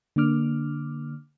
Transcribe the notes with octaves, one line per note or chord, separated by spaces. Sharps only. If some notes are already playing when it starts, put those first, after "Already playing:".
D3 A#3 D4 D6 F6